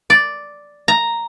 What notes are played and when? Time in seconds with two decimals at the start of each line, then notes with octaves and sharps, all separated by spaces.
0.10 D5
0.88 A#5